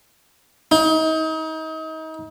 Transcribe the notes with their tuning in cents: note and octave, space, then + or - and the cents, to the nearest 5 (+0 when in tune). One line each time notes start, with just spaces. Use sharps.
D#4 +35